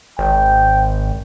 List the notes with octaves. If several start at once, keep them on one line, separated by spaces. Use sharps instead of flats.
G#1 G5